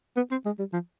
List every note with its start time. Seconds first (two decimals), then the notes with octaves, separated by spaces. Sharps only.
0.17 B3
0.31 C4
0.45 G#3
0.59 G3
0.73 F3